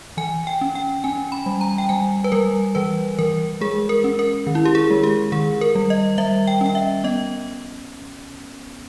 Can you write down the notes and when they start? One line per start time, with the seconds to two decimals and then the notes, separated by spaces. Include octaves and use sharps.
0.17 E3 G#5
0.47 G5
0.61 C#4
0.75 G5
1.04 C#4 G#5
1.32 B5
1.46 G3
1.61 A#5
1.78 G5
1.89 G3 G#5
2.24 B4
2.32 G3 A#4
2.75 E3 B4
3.19 E3 A#4
3.61 G#3 G#4
3.89 A#4
4.04 C#4
4.19 A#4
4.47 D#3
4.55 E4
4.65 G4
4.75 G#4
4.90 G#3
5.03 G4
5.32 D#3 G#4
5.61 A#4
5.75 G3
5.90 D#5
6.18 G3 E5
6.47 G5
6.61 C#4
6.66 G5
6.75 E5
7.04 B3 D#5